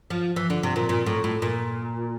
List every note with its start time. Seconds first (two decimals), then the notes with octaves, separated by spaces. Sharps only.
0.10 F3
0.36 E3
0.50 D3
0.63 C3
0.76 A#2
0.89 A#2
1.06 A2
1.24 A2
1.42 A#2